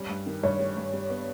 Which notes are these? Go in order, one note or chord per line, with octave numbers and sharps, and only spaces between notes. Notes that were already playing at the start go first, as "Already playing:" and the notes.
Already playing: G3 C#4
G2
D#3
G2 C#5
G3
G2
G3
B3